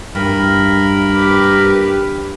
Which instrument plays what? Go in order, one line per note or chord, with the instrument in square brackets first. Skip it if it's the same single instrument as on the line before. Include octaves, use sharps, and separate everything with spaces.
[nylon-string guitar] G2 [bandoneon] A#4 B5
[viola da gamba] G4 B4